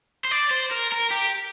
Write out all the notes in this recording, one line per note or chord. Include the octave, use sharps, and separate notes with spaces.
C5
D5
C5
A#4
A#4
G4